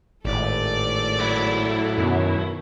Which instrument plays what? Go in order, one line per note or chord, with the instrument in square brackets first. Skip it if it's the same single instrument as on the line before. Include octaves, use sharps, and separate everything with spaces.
[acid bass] G#1 [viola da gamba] A2 A4 D5
[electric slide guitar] F#3 E4
[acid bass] F#2 [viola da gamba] B2 D#3